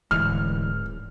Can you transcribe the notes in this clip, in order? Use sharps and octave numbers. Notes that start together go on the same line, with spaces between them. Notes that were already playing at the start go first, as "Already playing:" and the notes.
D1 D2 G#2 E3 F6